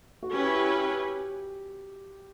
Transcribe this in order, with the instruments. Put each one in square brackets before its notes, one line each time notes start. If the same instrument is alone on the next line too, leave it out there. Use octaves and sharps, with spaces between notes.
[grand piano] F#4
[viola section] C#4 E4 B4 [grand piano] G4
[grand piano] G4
G4